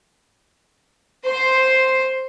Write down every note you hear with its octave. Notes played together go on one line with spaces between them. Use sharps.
C5 C6